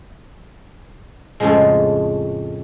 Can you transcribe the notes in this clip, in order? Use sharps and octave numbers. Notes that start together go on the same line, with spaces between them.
F2 A2 C#3 F3 G#3